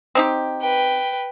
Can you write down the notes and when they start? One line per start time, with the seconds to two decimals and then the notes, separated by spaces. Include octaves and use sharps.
0.15 C4 D#4 G4
0.61 B4 G5